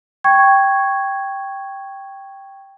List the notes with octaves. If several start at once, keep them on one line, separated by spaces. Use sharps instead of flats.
G5 C#6 G#6